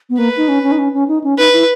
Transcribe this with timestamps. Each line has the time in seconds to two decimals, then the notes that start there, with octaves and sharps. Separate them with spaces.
0.10 B3
0.18 A#3 B4
0.37 D#4
0.48 C#4
0.63 C#4
0.72 D#4
0.78 C#4
0.94 C#4
1.08 D#4
1.24 C#4
1.38 D#4 B4
1.53 E4